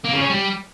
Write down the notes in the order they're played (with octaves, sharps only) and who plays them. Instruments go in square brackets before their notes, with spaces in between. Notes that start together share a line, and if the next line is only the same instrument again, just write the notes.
[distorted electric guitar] A#3
C#3
C#4
G3